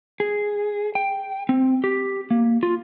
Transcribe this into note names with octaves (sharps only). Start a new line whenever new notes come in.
G#4
G5
C4
G4
A#3
F4